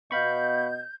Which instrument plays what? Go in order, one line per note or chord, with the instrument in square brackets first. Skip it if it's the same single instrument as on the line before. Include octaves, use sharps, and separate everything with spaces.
[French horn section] B2 B3 D#5 [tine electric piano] F5 B5 C#6 [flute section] G6